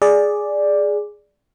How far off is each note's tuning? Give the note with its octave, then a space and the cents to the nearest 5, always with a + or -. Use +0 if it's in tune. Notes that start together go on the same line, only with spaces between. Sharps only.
G#4 +0 D5 +0